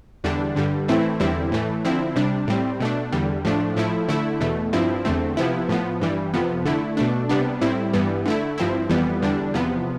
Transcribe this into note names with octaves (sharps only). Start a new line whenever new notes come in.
E2 D3 G3 D4
G2 D3 G3
A2 E3 A3 C4 E4
E2 D3 G3 C4 E4
A2 E3 A3
D3 F3 C4 E4
C3 G3 D4
A2 G3 C4
B2 A3 D4
E2 D3 G3
A2 F3 A3 D4
A2 F3 A3 E4
D3 A3 E4
E2 B2 A3
G2 F3 C4 E4
E2 D3 A3 C4
C3 F3 B3 E4
A2 F3 B3
G2 E3 G3
F2 C3 F3 B3
D3 A3 E4
B2 A3 D4
C3 G3 B3 D4
A2 G3 C4 E4
G2 E3 G3 B3
D3 A3 E4
G2 F3 C4 E4
F2 E3 G3 B3
E2 D3 G3 D4
E2 C3 F3 B3